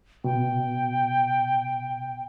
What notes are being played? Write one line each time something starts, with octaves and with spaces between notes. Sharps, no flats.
B2 G5